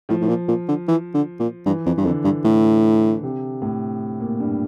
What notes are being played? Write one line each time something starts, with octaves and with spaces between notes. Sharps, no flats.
A2 F3
A2
A#2
A#2
D3
E3
D3
A#2
G2 E3
F2
G2
F2 D3
G2
A2
C3
A2
A#2
G2